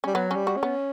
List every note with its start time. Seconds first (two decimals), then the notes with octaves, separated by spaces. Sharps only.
0.04 G3 C#4
0.14 F#3 B3
0.31 C#4
0.36 G3
0.47 F#4
0.57 C#4
0.63 B3